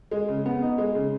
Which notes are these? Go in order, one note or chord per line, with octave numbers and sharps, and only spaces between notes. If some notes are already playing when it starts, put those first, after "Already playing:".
G#3
C#3
B3
D#4
G#3
C#3